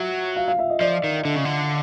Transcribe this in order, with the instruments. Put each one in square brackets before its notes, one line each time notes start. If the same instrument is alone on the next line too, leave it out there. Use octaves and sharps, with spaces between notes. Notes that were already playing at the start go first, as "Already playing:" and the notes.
Already playing: [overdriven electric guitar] F#3 [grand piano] E5
[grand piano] F5
F5
E5
D#5
[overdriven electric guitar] F3 [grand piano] D5
[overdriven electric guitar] D#3
D3
C#3
D3